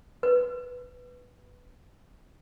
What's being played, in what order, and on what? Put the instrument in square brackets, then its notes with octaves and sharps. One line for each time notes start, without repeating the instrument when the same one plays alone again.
[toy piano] B4